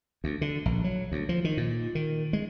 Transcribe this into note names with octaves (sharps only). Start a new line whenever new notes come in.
D2
D3
A#1
F#3
D2
F3
D#3
A#2
D#3
G#3